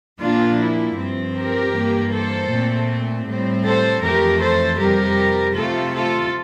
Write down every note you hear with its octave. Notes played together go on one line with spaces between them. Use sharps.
A#2 F3 A#3 D4 F4
E4
G2 F3 C4
G4 A#4
G2 E3 A#3
A4 C5
A#2 A3 C4
A2 G3 C4
A4 C5
F2 E3 A3 G4 A#4
A4 C5
F2 C3 G3 G4 A#4
C3 F3 A3 F4 A4
F4 A4